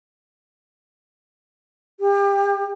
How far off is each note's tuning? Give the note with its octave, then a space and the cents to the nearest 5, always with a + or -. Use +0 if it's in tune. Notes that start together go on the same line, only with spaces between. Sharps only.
G4 +35